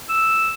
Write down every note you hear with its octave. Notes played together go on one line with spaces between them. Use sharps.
E6